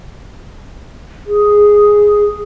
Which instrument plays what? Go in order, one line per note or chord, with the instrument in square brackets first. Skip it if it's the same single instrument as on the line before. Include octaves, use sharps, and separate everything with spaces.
[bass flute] G#4